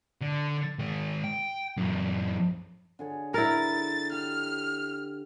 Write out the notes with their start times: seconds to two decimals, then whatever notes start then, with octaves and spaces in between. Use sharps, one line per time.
0.21 D3
0.79 D#3 G#3
1.24 G5
1.77 F#2 E3
2.99 D3 G#4 C#5
3.34 E4 A#4 A6
4.12 G4 F6